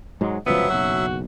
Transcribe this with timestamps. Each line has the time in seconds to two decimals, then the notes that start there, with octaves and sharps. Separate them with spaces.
0.21 G#2 F#3 G#3
0.46 G1 C#2 F3 F#3 B3 E5
0.70 F#1 B1 F#4